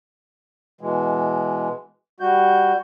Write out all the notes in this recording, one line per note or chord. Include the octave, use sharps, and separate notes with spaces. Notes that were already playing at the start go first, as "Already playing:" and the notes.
B2 E3 G#3
G3 F#4 G6